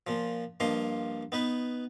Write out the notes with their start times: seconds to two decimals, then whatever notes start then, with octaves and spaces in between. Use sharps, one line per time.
0.07 A#2 F3
0.60 G2 F3 A#3 D#5 C6
1.32 B3 D#4 B4